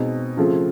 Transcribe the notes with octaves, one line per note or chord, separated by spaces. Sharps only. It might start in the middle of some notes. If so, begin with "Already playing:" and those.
Already playing: B2 G#3 C4 D#4
C#3 F3 A3 C4 F4